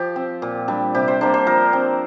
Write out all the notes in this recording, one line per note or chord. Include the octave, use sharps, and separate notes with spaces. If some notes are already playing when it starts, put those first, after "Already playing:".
Already playing: F3 G4
C4
A#2
G3 D4
C3 G4
C5
A#3 D4 C5
C5
F3 A#4
C4